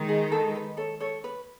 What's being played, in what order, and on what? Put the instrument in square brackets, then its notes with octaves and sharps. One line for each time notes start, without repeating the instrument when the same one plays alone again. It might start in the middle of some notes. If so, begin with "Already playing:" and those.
Already playing: [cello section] D#3 G#3 D#4
[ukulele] G#4
A4
B4
A4 C#5
A4 C#5
B4